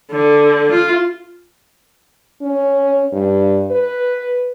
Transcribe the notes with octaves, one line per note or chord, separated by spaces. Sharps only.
D3
F4
C#4
G2
B4